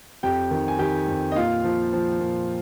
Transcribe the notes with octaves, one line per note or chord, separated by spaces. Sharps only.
F2 G4 G5
D#3
G#5
D#3 G4 G5
F2
D#5
A#2 F4 F5
F3
F3
A#2